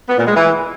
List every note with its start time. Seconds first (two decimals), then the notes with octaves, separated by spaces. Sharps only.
0.09 B3
0.18 A#2
0.26 G#3
0.35 E3